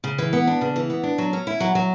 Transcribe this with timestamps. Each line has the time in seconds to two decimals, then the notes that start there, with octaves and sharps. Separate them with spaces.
0.04 C#3
0.18 E3
0.33 B3
0.47 D4
0.61 C#3
0.76 E3
0.90 B3
1.03 D4
1.18 F#3
1.33 C#4
1.47 E4
1.60 F#3
1.75 F#3